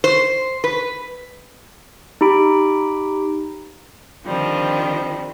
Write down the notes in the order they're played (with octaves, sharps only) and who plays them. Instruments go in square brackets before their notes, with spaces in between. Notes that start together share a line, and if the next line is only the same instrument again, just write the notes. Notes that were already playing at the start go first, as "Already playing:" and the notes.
[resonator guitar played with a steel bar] C5
B4
[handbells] D#4 G4 B5 D7
[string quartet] D3 D#3 F3 G3 C4